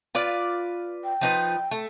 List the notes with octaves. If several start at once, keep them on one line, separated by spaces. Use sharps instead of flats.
F4 B4 D5
G5
F3 D#4 B4
A3